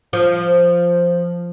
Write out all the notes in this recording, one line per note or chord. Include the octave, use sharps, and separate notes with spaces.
F3